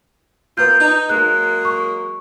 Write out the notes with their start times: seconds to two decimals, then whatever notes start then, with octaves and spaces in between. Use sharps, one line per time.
0.57 A#3 B3 F4 B4 G6
0.80 D#4
1.09 F#3 G#3 A#3 F#6
1.65 C#6